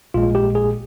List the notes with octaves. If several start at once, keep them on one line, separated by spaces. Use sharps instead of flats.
A#1 A#2 G#3 F4
G4
G#4